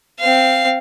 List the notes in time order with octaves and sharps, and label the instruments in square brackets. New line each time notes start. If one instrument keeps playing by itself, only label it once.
[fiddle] C4 F5